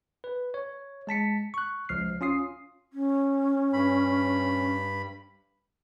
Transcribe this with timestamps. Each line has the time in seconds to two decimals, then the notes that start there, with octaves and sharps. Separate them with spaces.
0.24 B4
0.54 C#5
1.07 G#3 A5 B6 C#7
1.54 C#6 F#6
1.89 C#2 F3 F6 C7
2.21 C#4 F4 D#6 C7
2.92 C#4
3.73 G2 B5